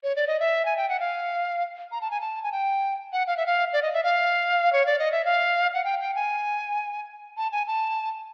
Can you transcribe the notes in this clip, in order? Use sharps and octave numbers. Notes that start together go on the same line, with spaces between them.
C#5
D5
D#5
E5
G#5
G5
F#5
F5
A#5
A5
G#5
A5
G#5
G5
F#5
F5
E5
F5
D5
D#5
E5
F5
C#5
D5
D#5
E5
F5
F#5
G5
G5
G#5
A5
G#5
A5